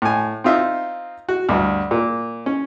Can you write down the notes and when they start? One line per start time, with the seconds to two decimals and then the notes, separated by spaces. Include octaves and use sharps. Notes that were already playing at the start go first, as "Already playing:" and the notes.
0.02 A2 G#5
0.44 C4 D#4 F4 E5
1.29 F#4
1.49 D2 G2
1.91 A#2
2.46 C#4